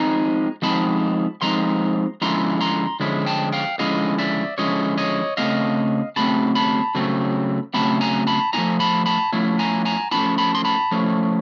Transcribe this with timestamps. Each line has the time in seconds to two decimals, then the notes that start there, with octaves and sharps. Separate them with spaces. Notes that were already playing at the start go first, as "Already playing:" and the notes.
Already playing: F3 G#3 C4 D#4 G#5 A#5
0.62 F3 G#3 C4 D#4 A5 B5
1.42 F3 G#3 C4 D#4 A#5 C6
2.22 D3 F3 G#3 C#4 E4 A#5 C6
2.61 A#5 C6
3.00 D3 F3 G#3 C#4 E4
3.26 G5 A5
3.52 F5 G5
3.79 D3 F3 G#3 C#4 E4 D#5 F5
4.18 D5 E5
4.58 D3 F3 G#3 C#4 E4 C#5 D#5
4.98 C#5 D#5
5.37 C#3 F#3 A3 C4 D#5 F5
6.16 C#3 F#3 A3 C4 A5 B5
6.55 A5 B5
6.95 C#3 F#3 A3 C4
7.74 C#3 F#3 A3 C4 A5 B5
8.01 G#5 A#5
8.27 A5 B5
8.53 F3 A3 C#4 E4 G#5 A#5
8.80 A5 B5
9.06 A5 B5
9.32 F3 A3 C#4 E4
9.59 G#5 A#5
9.85 G#5 A#5
10.11 F3 A3 C#4 E4 A5 B5
10.38 A5 B5
10.55 C6
10.65 A5 B5
10.91 F3 A3 C#4 E4